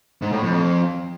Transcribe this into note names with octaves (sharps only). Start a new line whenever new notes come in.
G#2
A2
F2